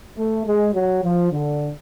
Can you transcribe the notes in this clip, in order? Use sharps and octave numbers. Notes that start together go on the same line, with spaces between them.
A3
G#3
F#3
F3
D3